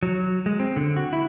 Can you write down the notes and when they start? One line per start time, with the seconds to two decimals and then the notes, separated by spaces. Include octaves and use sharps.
0.03 F#3
0.46 G#3
0.59 C4
0.76 D3
0.96 F#4
1.13 E4